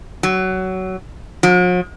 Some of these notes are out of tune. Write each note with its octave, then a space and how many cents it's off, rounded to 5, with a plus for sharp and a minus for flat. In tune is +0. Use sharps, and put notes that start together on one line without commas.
F#3 +20
F#3 -45